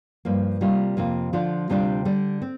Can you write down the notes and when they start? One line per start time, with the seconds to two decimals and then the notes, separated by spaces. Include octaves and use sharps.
0.25 G2 F3 A#3
0.61 C3 G3 A#3 F4
0.97 F2 C3 A#3 F4
1.33 D3 F3 D4 F4
1.69 D2 C3 G3 D4 F4
2.05 D3 G3 D4
2.42 C4